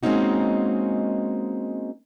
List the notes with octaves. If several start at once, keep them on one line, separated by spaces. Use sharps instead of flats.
G#3 A#3 C4 C#4 D#4 F#4